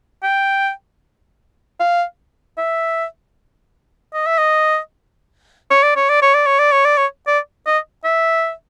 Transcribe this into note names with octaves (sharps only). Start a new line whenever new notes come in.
G5
F5
E5
D#5
E5
D#5
C#5
D5
C#5
D5
C#5
D5
C#5
D5
C#5
D5
C#5
D5
D#5
E5